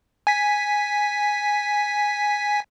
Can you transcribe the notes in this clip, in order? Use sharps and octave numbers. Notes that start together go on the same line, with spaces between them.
G#5 B6